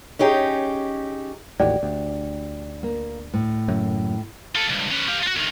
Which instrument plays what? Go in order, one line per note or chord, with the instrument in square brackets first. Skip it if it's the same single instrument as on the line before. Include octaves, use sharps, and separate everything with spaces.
[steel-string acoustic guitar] C#4 D#4 G4 G#4
[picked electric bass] A1 D#2 A2 [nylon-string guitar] F#4 G4 [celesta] D5
[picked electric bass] D2 [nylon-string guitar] D4 G4
[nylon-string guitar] A#3
A2
[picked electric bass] F#1 F#2
[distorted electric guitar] F4 A4
C#2 G2
C#4 B4
G4 F5
F4 F#4
D2 D#3